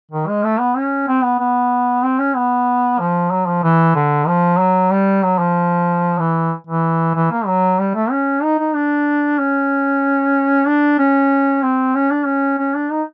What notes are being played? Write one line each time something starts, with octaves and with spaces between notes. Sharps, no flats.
D#3
G#3
A3
B3
C#4
C4
B3
B3
C4
C#4
B3
F3
F#3
F3
E3
D3
F3
F#3
G3
F#3
F3
E3
E3
E3
A#3
F#3
G3
A3
C#4
D#4
D#4
D4
C#4
D4
C#4
C4
C#4
D4
C#4
C#4
D4
D#4